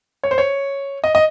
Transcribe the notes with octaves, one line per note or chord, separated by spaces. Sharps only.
C#5
C5
C#5
D#5
D#5